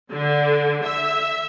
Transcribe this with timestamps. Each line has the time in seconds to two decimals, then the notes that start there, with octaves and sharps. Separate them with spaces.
0.12 D3
0.84 E5